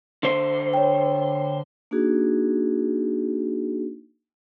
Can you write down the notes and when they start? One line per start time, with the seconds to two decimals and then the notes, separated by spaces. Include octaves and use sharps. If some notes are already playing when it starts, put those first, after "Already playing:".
0.23 D3 C5
0.74 C#5 G5
1.91 A#3 D4 D#4 F#4 G#4